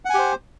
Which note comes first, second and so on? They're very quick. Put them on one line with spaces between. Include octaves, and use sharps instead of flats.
F#5 G#5 G4 C5